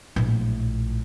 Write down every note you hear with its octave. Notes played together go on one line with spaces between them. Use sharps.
A#1 A2